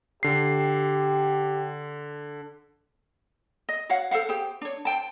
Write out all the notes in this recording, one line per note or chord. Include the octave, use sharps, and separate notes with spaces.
D3 G4 C7
D#5
F#4 C#5 F5 F#5
A4 C5 F5 F#5
G4 G#4 C5 G5
D4 C#5
C5 G5 A5